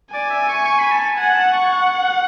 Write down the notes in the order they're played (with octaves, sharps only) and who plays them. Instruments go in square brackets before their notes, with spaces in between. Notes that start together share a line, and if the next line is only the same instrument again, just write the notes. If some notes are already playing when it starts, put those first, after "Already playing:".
[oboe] D5 [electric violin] G#5
[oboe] E5
C#6
C#6
B5
A5
[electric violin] F#5 [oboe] G#5
[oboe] A5
C#6
[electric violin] F#5